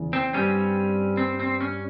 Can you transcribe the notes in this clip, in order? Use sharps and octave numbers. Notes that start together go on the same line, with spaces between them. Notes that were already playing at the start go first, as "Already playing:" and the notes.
Already playing: E2 C#3 F3
C4
G2 G3 C4 C#4
C4
C4
C#4